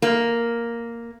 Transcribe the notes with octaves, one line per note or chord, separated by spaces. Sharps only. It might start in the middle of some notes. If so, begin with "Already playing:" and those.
A#3